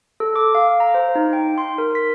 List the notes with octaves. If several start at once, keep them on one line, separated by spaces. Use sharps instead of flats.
A4
D6
F5
A#5
C5
D#4
G5
C6
A#4
B6